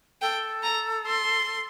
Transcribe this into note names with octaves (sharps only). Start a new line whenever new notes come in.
A4 G5
A#5
C6